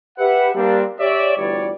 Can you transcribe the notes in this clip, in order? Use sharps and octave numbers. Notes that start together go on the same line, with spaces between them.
G4 B4 E5 F#5
G3 A#3 C4 D4
G4 C#5 D5 E5
G1 D2 E3 G3 C#5 D5